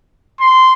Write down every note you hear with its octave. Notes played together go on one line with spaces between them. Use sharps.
C6